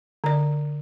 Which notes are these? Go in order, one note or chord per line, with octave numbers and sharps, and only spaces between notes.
D3 D5